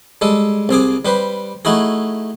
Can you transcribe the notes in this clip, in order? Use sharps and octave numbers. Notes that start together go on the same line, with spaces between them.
G3 G#3 A4
C2 C4 G#4 D6
G3 G4 B4 C5
A3 D#4 E4 F#4 G#4